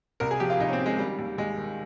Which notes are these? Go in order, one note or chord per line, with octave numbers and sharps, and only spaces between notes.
C2 A#4
G#4
F3 G4
F4
C2 D#4
C#4
C4
C3
G#3
D#3 G3
D#2
D#2 G#3
D#3